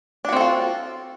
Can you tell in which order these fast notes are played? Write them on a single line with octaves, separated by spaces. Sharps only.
D4 F#4 C4 A4 F4